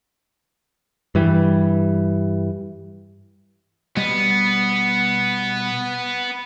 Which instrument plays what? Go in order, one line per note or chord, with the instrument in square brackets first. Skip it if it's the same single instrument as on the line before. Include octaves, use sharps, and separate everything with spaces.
[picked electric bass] G2 E3 G3
[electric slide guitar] B2 G3 D#5 [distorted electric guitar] B3